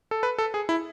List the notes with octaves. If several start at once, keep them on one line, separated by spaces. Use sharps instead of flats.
A4
B4
A4
G#4
E4